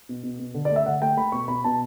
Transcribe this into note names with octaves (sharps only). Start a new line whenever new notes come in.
B2
B2
B2
D3
D5
A3
E5
D3 F#5
A3 G5
A3 B5
B2 C#6
B2 B5
B2 A5